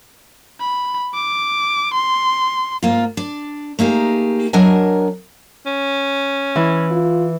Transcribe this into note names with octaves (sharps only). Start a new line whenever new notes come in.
B5
D6
C6
G#2 A#3 F4
D4 D5
A3 A#3 D#4 G4 G#4
F#3 D4 A#4 D#5 F#5 G#5
C#4
E3
F4